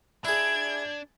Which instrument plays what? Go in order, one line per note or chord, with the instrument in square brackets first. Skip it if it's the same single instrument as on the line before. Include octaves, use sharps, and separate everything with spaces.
[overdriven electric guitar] D4 [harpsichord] E4 G#4 [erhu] G#6